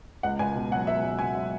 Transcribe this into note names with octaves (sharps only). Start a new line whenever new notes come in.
C#2 F#5
C#2 G#5
B2
F#3 F#5
C#2 E5
C#2
B2 G#5
F#3